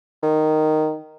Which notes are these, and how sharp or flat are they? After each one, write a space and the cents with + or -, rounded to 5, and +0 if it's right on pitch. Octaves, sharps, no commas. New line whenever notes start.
D#3 -5